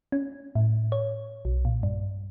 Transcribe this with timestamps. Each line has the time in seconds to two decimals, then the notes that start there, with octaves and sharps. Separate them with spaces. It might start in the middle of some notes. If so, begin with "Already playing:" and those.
0.12 C#4
0.55 A2
0.92 C#5
1.45 B1
1.65 A#2
1.83 G2